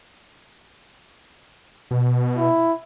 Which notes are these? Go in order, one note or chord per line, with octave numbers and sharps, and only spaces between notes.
B2
E4